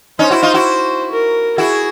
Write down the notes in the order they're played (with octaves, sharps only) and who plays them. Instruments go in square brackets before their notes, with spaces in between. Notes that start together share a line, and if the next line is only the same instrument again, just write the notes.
[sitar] C#4 D#4 [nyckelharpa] C5
[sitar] E4 F#4
D#4 F4
E4 F#4
[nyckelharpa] A#4
[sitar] E4 F#4 [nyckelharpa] G#4